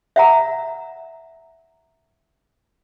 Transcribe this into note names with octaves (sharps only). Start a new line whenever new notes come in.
E5 F#5 A#5